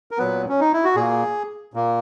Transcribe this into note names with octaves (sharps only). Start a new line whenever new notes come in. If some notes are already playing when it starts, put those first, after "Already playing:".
A#4
A#2 F#3 B3 B4
C#4
D#4
E4
F#4
A#2 A#3 G#4
A#2 A#3